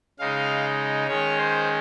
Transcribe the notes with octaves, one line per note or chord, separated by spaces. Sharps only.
C#3 G#3 D#4 F5
D#3 G#3 C#4 C#5
C5